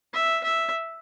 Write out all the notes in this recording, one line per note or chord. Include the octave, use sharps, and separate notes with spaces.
E5
E5